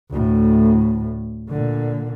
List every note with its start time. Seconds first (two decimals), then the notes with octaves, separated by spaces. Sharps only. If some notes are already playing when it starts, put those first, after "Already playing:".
0.11 D2 A2
1.49 A#2 D3